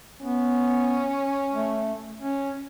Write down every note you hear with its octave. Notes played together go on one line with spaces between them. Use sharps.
B3 C#4
A3
C#4